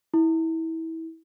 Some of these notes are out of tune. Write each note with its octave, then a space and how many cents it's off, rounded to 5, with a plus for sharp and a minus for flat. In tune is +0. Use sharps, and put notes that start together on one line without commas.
E4 -25